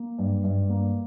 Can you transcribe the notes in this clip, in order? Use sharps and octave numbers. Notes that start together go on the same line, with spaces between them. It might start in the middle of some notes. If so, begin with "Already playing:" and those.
Already playing: A#3
G2
G2
A#3